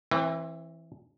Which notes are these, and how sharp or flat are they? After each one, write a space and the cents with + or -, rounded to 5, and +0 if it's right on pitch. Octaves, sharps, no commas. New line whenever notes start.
E3 +0 C4 +35